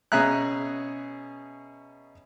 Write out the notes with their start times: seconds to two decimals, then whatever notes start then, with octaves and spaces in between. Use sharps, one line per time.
0.12 B2 C#4 G#4 E5 A#5 F#6